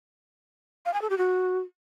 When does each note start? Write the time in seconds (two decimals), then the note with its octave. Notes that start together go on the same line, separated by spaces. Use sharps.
0.85 F5
0.94 G#5
1.02 A4
1.10 G4
1.18 F#4